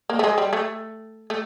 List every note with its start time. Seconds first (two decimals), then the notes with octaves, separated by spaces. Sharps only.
0.10 A#3
0.19 A3
0.24 G#3
0.38 G3
0.53 A3
1.30 A3